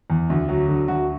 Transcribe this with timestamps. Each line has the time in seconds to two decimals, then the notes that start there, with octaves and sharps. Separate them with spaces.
0.10 E2
0.30 D2
0.49 F#3
0.68 D3
0.88 D2 F#4